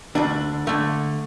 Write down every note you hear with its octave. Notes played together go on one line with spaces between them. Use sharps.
D2 D3 D4
D3 A3